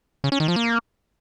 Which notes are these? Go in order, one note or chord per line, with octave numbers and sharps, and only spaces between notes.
C#3
C#4
D#3
F3
A#3